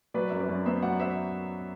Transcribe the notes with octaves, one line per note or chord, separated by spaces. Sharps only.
F#3 B4 D5
F#2 E5
B4 D5
F#2
B3 C5 E5
F#3 D5 F#5
C5 E5